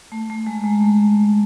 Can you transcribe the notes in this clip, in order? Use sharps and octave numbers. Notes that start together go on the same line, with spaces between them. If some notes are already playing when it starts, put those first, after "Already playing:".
A3
A3
G#3
G#3
A3